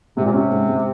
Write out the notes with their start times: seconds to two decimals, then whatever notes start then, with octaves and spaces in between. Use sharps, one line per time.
0.17 G#2 C3
0.25 A#2
0.32 C3 C#4
0.52 G#2
0.68 G#2